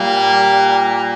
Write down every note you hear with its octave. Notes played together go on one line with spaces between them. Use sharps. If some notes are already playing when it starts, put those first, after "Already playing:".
Already playing: A#2 G3 A#3